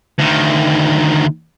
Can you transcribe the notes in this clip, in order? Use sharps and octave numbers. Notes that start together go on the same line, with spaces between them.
D2 D#3